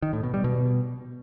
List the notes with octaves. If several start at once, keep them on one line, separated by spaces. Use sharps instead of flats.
D#3
A2
B2
G3
B2